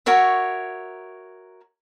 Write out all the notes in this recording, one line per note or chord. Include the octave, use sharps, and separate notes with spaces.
F#4 A#4 C#5 E5